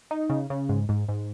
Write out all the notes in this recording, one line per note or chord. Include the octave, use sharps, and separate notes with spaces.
D#4
C#3
C#3
G#2
G#2
G#2